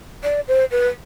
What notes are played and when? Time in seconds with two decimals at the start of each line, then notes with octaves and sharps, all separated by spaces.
0.24 D5
0.48 C5
0.71 B4